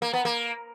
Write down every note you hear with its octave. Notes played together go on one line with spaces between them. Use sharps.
A#3
B3
A#3